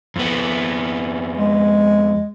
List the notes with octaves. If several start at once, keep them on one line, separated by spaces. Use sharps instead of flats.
F2 B3
G#3